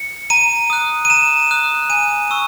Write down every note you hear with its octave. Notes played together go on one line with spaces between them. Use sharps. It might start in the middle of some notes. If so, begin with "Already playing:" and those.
Already playing: C#7
A#5 D#7
D#6 F#6
D#7
A#5 E7
D#6 F#6
G#5 D#7
C#6 E6